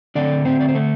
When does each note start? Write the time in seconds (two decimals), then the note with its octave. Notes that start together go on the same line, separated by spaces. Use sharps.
0.15 D3 A3 C4 D4 D5
0.45 C4 C5
0.60 D5
0.68 C5
0.75 A3 A4